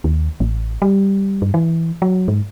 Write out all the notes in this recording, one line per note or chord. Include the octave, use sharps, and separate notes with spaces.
D#2
A1
G3
G2
E3
F#3
G#2